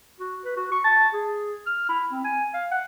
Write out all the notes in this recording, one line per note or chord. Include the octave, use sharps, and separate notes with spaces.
F#4
B4
F#4
C#6
A5
G#4
F6
E4
C4
G#5
F5
F#5